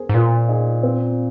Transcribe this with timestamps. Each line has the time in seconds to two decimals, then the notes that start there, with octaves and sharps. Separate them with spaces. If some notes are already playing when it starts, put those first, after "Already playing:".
Already playing: G#4 A#4 C5
0.09 G#2
0.14 A#2 F4 A#4
0.49 D#4 G#4
0.83 C4 F4